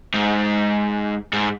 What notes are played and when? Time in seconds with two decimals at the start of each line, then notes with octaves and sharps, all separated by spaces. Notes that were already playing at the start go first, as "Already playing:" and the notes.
0.14 G#2
1.33 G#2